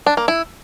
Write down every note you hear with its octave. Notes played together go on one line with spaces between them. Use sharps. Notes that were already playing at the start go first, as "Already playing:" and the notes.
D4
A#3
E4